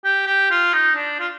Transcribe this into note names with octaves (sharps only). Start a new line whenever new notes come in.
G4
G4
F4
D#4
D4
F4